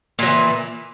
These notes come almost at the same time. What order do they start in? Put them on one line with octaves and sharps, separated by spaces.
A#2 F#3 E3